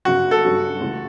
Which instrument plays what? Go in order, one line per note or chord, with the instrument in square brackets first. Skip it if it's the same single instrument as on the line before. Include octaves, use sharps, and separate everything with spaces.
[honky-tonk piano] G1 F#2 C#3 [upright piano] F#4
[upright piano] A4
[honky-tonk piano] G2 F#3 C#4 F#4
C#2 C#3 E3 A3